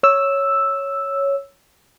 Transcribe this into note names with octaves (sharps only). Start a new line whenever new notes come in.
C#5 E6